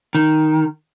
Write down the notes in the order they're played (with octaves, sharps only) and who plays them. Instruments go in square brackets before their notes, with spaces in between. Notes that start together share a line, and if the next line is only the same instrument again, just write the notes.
[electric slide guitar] D#3